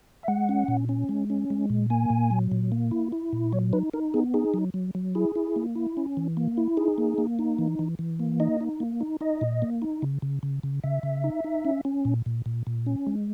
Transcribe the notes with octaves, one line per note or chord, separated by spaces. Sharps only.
E5
G#3 F#5
C#4
A#2
C#4
G#3
C#4
G#3
A#2
A#3 G#5
A#2
F#3
A#2
A#3
E4
E4
A#2
F#3 C#5
D#4 B4
D#4 A#4
B3 G#4
D#4 G#4
F#3
F#3
F#3
E4 G#4
E4
A#3
E4
C#4
E3
A#3
E4
D#4 G#4
A#3
A#3
D#4
E3
E3
E3
A#3
D#4 D#5
D#4
A#3
D#4
D#4 D#5
A#2
A#3
D#4
C#3
C#3
C#3
C#3
C#3 E5
C#3
D#4
D#4
C#4
C#4
A#2
A#2
A#2
A#2
C#4
G#3